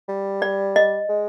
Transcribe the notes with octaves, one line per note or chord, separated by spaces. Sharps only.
G3
D5
D#5
G#3